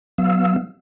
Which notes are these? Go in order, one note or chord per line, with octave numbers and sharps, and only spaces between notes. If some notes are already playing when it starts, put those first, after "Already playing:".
F#3 B3 F5 E6